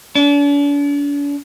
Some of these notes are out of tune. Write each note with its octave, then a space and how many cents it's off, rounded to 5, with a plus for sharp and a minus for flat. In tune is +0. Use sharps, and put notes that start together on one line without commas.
D4 -45